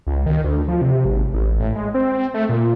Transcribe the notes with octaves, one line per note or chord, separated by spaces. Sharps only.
C#2
D#3
D2
F3
C3
G#1
A1
A2
G#3
C4
A3
A#2